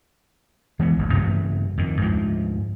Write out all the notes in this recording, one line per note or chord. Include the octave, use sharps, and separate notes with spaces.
E3 G#3 B3
G#1 D2
G2 C#3 E3 A3
F2 D#3
D2 G#2 F3